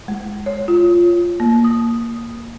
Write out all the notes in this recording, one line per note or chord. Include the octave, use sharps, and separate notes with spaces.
G#3
C#5
F4
A#3
D#6